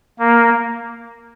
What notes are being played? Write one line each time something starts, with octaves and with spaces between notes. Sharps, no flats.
A#3